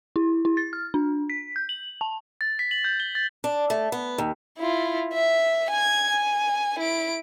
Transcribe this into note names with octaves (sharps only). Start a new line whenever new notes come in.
E4
E4
A6
F6
D4
B6
G6
F#7
A5
A6
B6
F#7
G6
G7
A6
D4
A3
B3
D#2
E4 F4
E5
G#5 G#6
G#5
E4 D7